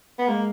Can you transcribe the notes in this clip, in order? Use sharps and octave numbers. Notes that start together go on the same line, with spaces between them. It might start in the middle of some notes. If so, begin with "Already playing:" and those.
B3
G#3 A#3